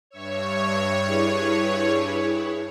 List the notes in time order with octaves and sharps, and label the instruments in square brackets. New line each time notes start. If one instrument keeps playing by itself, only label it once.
[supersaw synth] G2 C#5 [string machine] E5 C#6 E6
[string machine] E4 G#4 B4